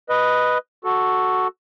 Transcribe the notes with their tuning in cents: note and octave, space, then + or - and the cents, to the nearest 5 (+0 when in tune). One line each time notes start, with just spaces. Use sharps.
B4 +0 D#5 +0
F#4 +0 A4 +0